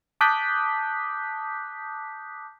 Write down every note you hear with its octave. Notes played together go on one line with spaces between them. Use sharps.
A5 D6 D#6 F#6 G6 B6